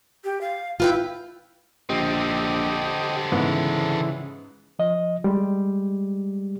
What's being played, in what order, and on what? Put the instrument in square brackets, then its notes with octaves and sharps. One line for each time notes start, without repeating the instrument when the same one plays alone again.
[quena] G4
F5
[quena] E4 [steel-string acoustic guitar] F4 B4 G5
[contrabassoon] A#1 [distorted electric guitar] D3 C4 [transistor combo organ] G4 D#5
[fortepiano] G#2 B3 [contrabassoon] C#3 [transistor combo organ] E3
[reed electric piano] F3 D#5
G3 G#3 G4